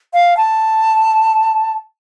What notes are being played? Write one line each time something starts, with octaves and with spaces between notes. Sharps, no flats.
F5
A5